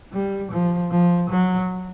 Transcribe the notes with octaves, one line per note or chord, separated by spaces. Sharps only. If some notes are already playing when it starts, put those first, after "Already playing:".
G3
F3
F3
F#3